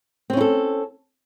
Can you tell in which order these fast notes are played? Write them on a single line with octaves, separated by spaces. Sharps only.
C4 C#4 E4 A4